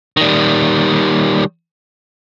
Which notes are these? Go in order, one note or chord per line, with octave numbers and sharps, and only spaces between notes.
D#3 G3